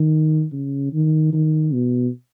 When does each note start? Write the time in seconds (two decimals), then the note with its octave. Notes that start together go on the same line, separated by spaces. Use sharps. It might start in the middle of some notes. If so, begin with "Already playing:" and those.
Already playing: D#3
0.52 C#3
0.93 D#3
1.33 D#3
1.72 B2